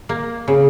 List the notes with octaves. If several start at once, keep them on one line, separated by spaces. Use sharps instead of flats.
A#3
C#3